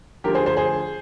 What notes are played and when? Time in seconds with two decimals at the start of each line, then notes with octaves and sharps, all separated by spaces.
0.24 D2 D3 F3 G4 A#4
0.35 G#4 C5
0.46 G#4 C5
0.57 G#4 C5